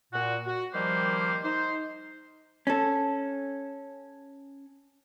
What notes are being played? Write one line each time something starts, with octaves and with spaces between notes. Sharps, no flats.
A#2 F#4
F#4
D#3 F3 G3 A#3 G4 C5
D#4 C5
C#4 A4